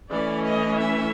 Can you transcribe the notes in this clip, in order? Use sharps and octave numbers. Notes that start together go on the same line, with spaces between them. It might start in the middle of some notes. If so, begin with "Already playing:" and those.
E3 A3 C#4 D5
D#5
E5